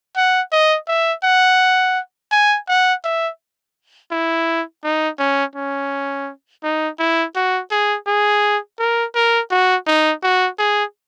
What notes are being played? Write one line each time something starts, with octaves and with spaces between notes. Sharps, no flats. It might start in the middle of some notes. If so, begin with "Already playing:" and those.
F#5
D#5
E5
F#5
G#5
F#5
E5
E4
D#4
C#4
C#4
D#4
E4
F#4
G#4
G#4
A#4
A#4
F#4
D#4
F#4
G#4